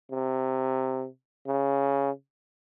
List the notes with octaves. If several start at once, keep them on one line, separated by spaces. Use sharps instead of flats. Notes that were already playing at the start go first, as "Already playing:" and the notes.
C3
C#3